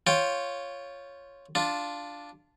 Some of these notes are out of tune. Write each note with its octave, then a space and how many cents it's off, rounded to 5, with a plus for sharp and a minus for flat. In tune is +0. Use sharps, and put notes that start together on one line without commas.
F4 +0 C#5 +0 G5 +0
D4 +0 F4 +0